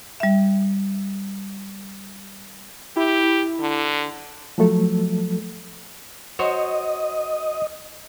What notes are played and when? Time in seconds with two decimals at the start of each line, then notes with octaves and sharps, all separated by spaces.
0.20 G3 E5
2.96 E4 G4
3.60 D3
4.58 F3 F#3 A3 A4
6.39 F#4 C5 C#5 D#5